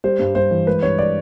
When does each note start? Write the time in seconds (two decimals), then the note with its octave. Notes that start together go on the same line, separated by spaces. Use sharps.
0.04 G3 C5
0.19 G2
0.35 G2 C5
0.51 E3
0.67 G#3 B4
0.82 G2 C#5
0.98 D5